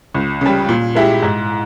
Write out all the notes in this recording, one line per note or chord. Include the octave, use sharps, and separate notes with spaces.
C#2
C#3 G3
A#2
G#3 E4 G4
G#2